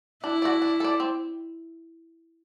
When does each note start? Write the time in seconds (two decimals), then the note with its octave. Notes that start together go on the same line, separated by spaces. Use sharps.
0.24 D4 E4
0.42 F#4 A4 D5
0.62 D4
0.80 A4 D5
1.00 C4